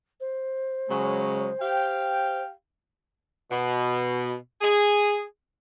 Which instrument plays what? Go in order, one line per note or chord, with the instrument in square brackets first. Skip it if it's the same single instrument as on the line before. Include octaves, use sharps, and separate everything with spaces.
[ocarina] C5
[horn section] C#3 F#3 G#3
G4 F5 G5
B2
G#4